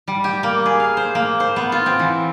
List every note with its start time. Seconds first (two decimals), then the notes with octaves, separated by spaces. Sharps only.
0.08 G3
0.24 G4
0.43 A#3
0.66 G#4
0.80 F5
0.97 C5
1.15 A#3
1.40 C5
1.56 B3
1.72 F4
1.86 C4
1.99 E3